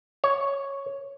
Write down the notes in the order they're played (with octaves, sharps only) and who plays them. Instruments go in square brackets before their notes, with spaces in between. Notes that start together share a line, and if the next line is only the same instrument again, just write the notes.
[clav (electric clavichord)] C#5